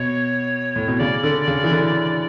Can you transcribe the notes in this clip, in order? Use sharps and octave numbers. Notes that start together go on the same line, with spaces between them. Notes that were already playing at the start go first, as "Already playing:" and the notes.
Already playing: B2 C#5
A2
B2
C#3 D5
D3
C#3
E3
D3